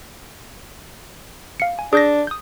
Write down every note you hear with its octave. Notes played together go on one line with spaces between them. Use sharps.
F5 C#7
G#5
D4 G#4 G6 A#6
D#6 G6